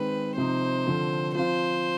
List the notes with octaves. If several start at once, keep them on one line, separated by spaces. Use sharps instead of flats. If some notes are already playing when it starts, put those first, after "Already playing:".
Already playing: D#3 G#3 C4 B4
C3 F3 C4 D#4 C5
D3 F3 C4
F3 C4 F4 C5